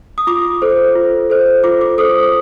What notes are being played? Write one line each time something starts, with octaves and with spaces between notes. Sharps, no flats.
D#6
F4 D6
A4 C5
F4
A4 C5
F4 D6
D6
A4 C5 D#6